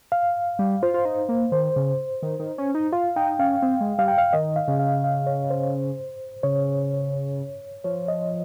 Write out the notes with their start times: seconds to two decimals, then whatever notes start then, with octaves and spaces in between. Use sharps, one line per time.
0.12 F5
0.59 G3
0.83 F4 C5
0.94 F4
1.05 D#4
1.29 A#3
1.52 D#3 C5
1.76 C#3
2.23 D#3
2.39 D#3
2.58 C#4
2.75 D#4
2.92 F4 F5
3.16 D#4 G5
3.39 C#4 F5
3.62 C4
3.81 G#3
3.98 G3 F5
4.08 G5
4.18 F5
4.33 D#3 D#5
4.56 F5
4.68 C#3
4.79 F5
5.04 F5
5.27 C#5
5.50 C5
6.43 C#3 C#5
7.84 F3 C#5
8.08 D#5